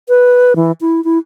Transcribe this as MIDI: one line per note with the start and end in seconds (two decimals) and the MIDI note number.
0.09 0.53 71
0.56 0.72 52
0.81 1.03 64
1.04 1.18 64